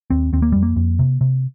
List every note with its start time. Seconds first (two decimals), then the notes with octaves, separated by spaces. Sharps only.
0.10 D#2 C4
0.33 D#2 C4
0.42 A#3
0.52 F2 G3
0.63 A#3
0.76 F2
0.99 C3
1.21 C3